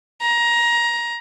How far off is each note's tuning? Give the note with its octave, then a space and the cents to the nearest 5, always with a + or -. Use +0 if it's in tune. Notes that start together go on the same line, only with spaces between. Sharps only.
A#5 +20